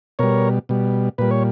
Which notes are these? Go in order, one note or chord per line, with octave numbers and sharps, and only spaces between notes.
B2 G3 A#4 C#5
B2 G3
A#2 G3 B4
C#5